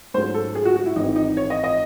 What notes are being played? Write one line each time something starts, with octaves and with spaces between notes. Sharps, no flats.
G#2 F#3 A3 C#4 C5
A4
G#4
F#4
F#4
E4
G#1 G#2 E3 C4 D#4
D#4
C#5
D#5
D#5